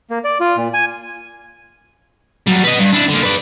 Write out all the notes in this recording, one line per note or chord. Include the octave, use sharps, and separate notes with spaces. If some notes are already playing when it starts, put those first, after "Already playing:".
A#3
D5
F4
A#2
G#5
F#3 G3
B4 D#5
G2
D4 E4
D3 A#3
B4 D5